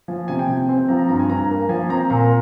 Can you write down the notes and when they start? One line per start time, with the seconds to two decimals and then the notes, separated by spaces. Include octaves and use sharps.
0.08 F3 G#5
0.28 C3 G#5
0.39 G5
0.49 C3
0.69 C4
0.88 F3 A#5
0.99 A#5
1.09 G2 A#5
1.19 G#5
1.30 G2 A#5
1.50 A#3
1.69 F3 G#5
1.89 C4 A#5
2.10 A#2 A#5